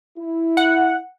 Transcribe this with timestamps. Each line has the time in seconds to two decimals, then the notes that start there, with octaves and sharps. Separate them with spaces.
0.18 E4
0.57 F#5